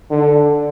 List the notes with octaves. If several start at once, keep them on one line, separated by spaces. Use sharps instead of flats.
D3